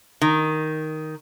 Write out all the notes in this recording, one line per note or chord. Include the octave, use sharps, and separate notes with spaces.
D#3